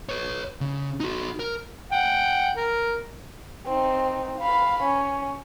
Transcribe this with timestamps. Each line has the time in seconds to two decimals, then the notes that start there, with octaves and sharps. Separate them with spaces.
0.09 B4 C#5
0.61 C#3
1.00 D#4 F#4
1.39 A#4
1.92 F#5 G5
2.57 A#4
3.66 C4 D#4
4.39 F5 B5
4.83 C#4